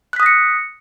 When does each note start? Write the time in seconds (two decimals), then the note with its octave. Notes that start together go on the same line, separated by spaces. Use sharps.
0.13 F#6
0.16 B6
0.20 D#6
0.23 A#6
0.26 C#7